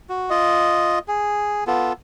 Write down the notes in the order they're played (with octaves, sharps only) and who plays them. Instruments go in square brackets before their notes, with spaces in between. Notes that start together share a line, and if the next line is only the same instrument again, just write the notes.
[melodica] F#4
F4 D#5
G#4
B3 F4 A4